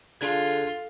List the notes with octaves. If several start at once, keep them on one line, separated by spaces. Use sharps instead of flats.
D3 D4 F4 G#4 G#6